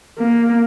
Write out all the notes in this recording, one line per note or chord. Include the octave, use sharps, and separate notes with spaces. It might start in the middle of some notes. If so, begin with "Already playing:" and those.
A#3